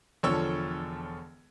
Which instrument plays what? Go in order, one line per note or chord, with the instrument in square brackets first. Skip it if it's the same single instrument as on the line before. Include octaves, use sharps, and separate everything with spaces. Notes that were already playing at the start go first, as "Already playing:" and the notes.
[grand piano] E1 D3 F3 A4 C#5 E6